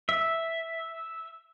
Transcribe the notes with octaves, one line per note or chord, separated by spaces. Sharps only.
E5